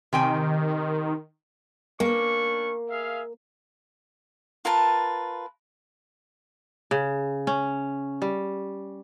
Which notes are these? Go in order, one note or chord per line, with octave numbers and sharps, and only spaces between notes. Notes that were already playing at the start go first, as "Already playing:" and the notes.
C3 D#3 G5 G#5
A#3 C#4 D4 C#6
G#4 E5 F5
F4 A#4 B4 A5
C#3
C#4
G3